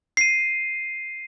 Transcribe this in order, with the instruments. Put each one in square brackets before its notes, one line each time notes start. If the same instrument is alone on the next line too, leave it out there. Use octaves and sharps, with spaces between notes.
[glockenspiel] C7 D#7